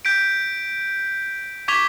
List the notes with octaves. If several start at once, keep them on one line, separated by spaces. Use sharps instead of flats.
G6 B6 D7
C#6 D6 G#6 B6 F7 G7